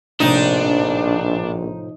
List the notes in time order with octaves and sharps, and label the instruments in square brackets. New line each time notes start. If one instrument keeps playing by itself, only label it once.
[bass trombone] A#1 [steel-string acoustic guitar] A2 C3 F3 [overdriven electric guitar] D4 [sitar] D#4